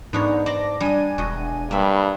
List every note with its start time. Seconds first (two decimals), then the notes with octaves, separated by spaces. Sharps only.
0.13 G#2 B3 D4 D#4 C#5
0.46 D5 A5 C6 D6 A#6
0.80 G3 D4 D#5 G#5 D#7
1.18 E1 F#4 D#5
1.71 G2 G3 A#3 E5 B5